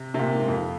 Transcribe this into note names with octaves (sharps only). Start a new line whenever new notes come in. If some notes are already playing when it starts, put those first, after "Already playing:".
Already playing: C3
C3
A#2
G#2
F2